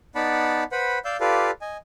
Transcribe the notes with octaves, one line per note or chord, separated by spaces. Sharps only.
B3 D#4 D5 F#5 A5 B5
B4 C5 F#5 B5
D5 F5 E6 G6
F4 G4 A4 B4 D5 F5
D#5 G#5